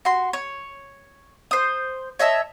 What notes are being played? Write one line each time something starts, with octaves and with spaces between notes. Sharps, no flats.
F#4 C6
C#5
C5 D#6
C#5 D#5 E5 A5